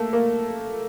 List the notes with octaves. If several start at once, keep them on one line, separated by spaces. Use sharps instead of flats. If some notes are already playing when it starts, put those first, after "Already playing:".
Already playing: A3 A#3
A#3